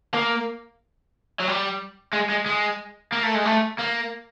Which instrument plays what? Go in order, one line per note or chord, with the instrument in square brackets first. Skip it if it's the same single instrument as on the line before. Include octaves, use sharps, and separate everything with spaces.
[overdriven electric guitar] A#3
F#3
G3
G#3
G#3
G#3
A#3
A3
G#3
A3
A#3